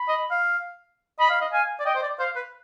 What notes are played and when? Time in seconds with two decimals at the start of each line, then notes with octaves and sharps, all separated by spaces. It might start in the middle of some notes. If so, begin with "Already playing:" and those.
Already playing: B5
0.08 D#5
0.31 F5
1.19 D#5 B5
1.30 F5
1.41 D#5
1.53 F5 G#5
1.80 D5
1.86 D#5 G5
1.95 C5
2.03 D5
2.19 C5 F5
2.36 B4